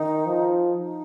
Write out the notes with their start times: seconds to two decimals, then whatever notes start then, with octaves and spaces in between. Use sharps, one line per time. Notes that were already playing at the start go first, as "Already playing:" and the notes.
Already playing: D#3 D#4
0.26 F3
0.78 D#4